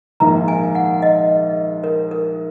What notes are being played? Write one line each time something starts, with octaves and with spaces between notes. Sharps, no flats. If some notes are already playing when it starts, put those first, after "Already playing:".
A#1 G#2 D#3 A#3 A#5
G#5
F#5
D#5
A#4
A#4